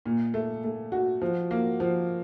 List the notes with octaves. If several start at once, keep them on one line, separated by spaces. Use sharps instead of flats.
A#2
A3
A3
F#4
F3
A#3
F3